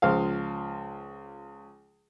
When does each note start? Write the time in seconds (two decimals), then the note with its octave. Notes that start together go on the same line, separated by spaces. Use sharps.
0.02 C#2 F3 F5